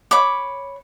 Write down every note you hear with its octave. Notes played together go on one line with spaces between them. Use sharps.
C#5 B5 D6